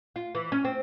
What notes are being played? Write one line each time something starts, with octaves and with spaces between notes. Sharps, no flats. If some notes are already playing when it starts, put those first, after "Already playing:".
F4
E3
C#4
C4